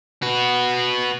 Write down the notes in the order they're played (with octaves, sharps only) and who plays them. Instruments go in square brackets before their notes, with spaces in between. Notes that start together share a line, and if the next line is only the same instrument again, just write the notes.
[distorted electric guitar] F#4 B4